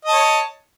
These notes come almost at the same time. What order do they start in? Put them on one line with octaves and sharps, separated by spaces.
D#5 A5 C#5